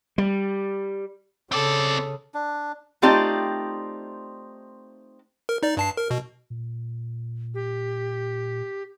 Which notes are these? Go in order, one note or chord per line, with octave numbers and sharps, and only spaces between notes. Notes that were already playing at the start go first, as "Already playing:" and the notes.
G3
C#3 C4 A4 D5
D4
A3 C4 D#4 F4 G4 D5
A#4
D#4 D5
G2 A5 C7
A#4
B2
A#2
G4